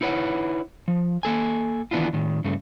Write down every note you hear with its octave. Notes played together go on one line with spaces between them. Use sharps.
D#4 E4 B4 C#5 F#5
F3
A#3 A4 G#5
D#3 E3 B3 D4 E4 F4
A2 D#3
G2 C#3 A3